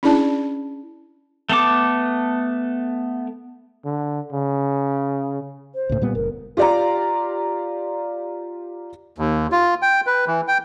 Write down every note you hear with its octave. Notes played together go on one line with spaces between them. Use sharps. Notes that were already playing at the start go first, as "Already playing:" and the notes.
C#4 D4 E4 G#4 D5 A5
A3 B3 A4 D6
D3
C#3
C5
C#2 A2
A#2 G3 B3
F#1 A#4
F4 G4 D5 F5 A#5
D#2
F4
G5
B4
E3
G5